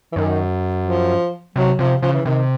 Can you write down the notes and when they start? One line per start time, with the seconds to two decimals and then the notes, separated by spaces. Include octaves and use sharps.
0.12 E3
0.16 F#2 D#3
0.85 F3
1.56 C3 F#3
1.78 C3 F3
2.02 C#3 F3
2.13 E3
2.26 C3 D#3